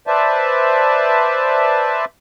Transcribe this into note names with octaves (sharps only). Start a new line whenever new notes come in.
B4 C5 D5 E5 A5